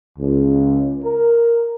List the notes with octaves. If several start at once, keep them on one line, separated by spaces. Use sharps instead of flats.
C#2
A#4